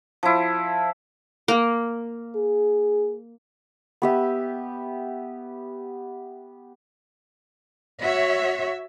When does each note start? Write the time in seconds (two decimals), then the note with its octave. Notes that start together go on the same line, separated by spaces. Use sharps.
0.23 F3 E4
1.48 A#3
2.36 G#4
4.02 B3 G4 E5
8.01 F#4 C#5 E5